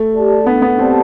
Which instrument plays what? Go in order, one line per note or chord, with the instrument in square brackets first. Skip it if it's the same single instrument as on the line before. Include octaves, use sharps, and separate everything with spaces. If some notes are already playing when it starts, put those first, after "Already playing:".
Already playing: [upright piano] A3
[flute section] G4 D5 A5
[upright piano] B3 [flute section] D4
[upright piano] B3
[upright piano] C4 [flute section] G4 D5 A5